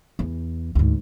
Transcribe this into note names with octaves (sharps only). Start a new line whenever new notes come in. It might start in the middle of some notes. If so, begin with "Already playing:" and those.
E2
D2 G#2